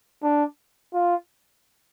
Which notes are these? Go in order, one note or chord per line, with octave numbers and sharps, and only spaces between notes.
D4
F4